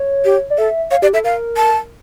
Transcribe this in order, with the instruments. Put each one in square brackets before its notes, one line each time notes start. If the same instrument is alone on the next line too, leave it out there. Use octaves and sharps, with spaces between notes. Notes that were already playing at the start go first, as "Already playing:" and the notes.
Already playing: [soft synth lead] C#5
[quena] G4
[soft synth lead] D5
[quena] A4 [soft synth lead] E5
[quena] C#5 [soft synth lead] F5
[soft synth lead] G4 [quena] D5
[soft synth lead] A4 [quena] E5
[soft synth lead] A#4 [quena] F5
[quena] A5